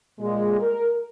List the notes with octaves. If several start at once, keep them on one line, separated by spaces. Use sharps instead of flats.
A#2 G#3
A#4